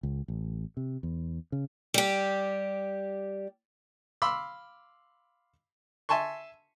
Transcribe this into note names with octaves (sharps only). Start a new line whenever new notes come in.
C#2
A1
C3
E2
C#3
G3 G4
F5 B5 C6 D6 E6
E5 G#5 A5 C6 C#6